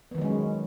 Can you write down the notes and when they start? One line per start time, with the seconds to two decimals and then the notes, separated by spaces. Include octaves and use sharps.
0.11 B3
0.15 D#3
0.18 F#3
0.21 G#3
0.25 C#4